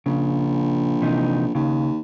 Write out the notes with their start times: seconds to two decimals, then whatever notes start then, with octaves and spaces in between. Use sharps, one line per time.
0.06 A#1 C#3
1.02 C3 E3 D#4
1.55 D#2 C#3